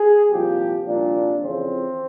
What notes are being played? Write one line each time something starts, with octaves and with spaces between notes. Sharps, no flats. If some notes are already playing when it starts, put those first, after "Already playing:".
Already playing: G#4
C2 A#2 F3 G4
C2 A#2 F3 D4
F2 C#3 E3 C4